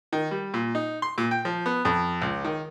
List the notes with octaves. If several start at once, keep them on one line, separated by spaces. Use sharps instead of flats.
D#3
G3
A#2
D#4
C6
A#2
G5
F3
B3
F2
C#2
D#3